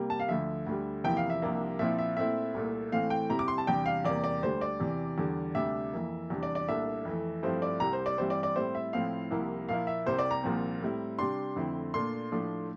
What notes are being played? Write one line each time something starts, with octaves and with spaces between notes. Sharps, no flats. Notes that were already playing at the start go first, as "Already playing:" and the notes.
Already playing: C3 G3 A#3
A5
F5
D2 D3 F3 E5
D2 D3 G3
E2 C3 F3 A#3 E4 G5
F5
E5
C2 C3 F3 A#3 D4
A#2 F3 C4 E4 E5
E5
A#2 A3 C4 E4 E5
C2 A#2 A3
A2 E3 A3 C4 F5
G5
C3 G3 C4 E4 A#5
D6
C6
A5
E2 C3 G3 D4 G5
F5
E2 C3 G3 A#3 D5
D5
D2 D3 G3 D4 C5
D5
E2 C3 E3
E2 D3 G3 D4
D2 C3 G3 D4 E5
F2 E3 A#3
E2 C3 G3 D4
D5
D5
C2 A#2 A3 D4 E5
F2 E3 A3
G2 F3 A3 C4 E4 C5
D5
C2 C3 G3 A#5
C5
D5
G2 E3 G3 C4 E4 C5
D5
D5
A2 G3 C4 E4 C5
E5
A2 F3 C4 E4 F5
C2 C3 F3 A#3 E4
A#2 F3 A#3 E4 F5
E5
C2 C3 G3 C5
D5
A#5
C2 A#2 F3 C4
A2 G3 C4 E4
C3 G3 D4 C6
F2 D3 A3 C4 E4
A#2 A3 D4 C6
A2 F3 A3 D4